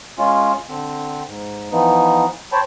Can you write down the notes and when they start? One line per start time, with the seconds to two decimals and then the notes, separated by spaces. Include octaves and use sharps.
0.18 G#3 C#4 F4
0.69 D3 C4
1.28 G#2
1.72 E3 F3 B3 D#4
2.52 C5 C#5 G5 A5 B5